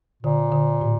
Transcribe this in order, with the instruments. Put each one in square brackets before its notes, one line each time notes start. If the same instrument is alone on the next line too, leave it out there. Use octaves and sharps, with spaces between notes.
[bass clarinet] A#2 [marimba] D3
[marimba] D3
A2